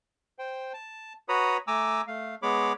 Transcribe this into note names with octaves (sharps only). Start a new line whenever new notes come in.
C5 G5
A5
F#4 B4 C#5 A#5 B5 D#6
A3 G#5 A#5 D6 E6
A3 F5
G#3 B3 G#4 C#5 B5 D6